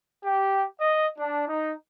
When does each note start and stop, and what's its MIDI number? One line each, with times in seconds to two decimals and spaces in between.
0.25 0.64 67
0.81 1.06 75
1.19 1.46 62
1.48 1.73 63